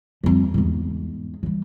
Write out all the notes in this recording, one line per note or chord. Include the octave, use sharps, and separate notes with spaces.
F2 G3
E2 G#2
E3 G3